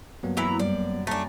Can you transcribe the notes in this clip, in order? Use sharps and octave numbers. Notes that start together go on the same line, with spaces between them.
G2 F#3 A#3 B3
E3 E4 A#5
F#2 G3 D5
A3 A#3 D4 G#5 A#5 A6